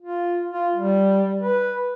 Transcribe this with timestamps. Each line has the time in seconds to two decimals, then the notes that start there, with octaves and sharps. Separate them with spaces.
0.01 F4
0.51 F4
0.75 G3
1.41 B4